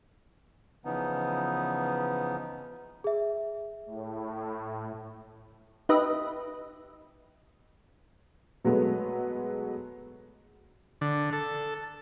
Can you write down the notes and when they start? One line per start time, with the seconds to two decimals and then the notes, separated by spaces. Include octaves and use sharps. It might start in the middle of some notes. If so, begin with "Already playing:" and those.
0.85 C#3 E3 F3 B3 D#4
3.04 G#4 E5
3.86 A2
5.89 D#4 G4 B4 D#5 E5
8.64 B2 F#3 G#3 A3 B3
11.01 D3
11.33 A4